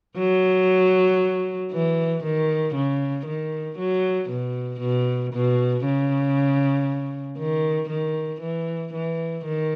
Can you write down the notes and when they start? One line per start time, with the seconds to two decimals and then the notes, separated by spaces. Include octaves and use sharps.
0.18 F#3
1.72 E3
2.24 D#3
2.75 C#3
3.26 D#3
3.79 F#3
4.30 B2
4.80 B2
5.33 B2
5.85 C#3
7.38 D#3
7.90 D#3
8.41 E3
8.94 E3
9.45 D#3